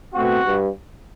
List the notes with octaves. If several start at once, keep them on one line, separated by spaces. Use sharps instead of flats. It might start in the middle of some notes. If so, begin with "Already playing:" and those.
B2 A3 C4 F#4
G2